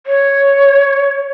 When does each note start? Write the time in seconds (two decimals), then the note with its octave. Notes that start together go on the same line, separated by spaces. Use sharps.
0.06 C#5